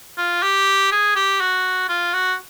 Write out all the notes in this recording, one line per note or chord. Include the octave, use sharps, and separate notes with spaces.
F4
G4
G#4
G4
F#4
F4
F#4